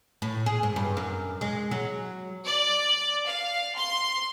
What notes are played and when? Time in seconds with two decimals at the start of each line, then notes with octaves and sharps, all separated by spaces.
0.22 A2
0.46 G#4
0.63 G#2
0.76 G2
0.97 F#2
1.41 G#3
1.71 F#3
2.46 D5
3.26 F5
3.77 C6